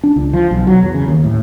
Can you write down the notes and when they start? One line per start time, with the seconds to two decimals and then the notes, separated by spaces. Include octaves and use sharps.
0.04 D4
0.16 C#2
0.33 F3
0.51 B1
0.67 F#3
0.83 E2
0.94 C#3
1.08 D#2
1.24 A2